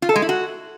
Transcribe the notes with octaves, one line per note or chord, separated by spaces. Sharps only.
F4
A4
G#3
E4
F#4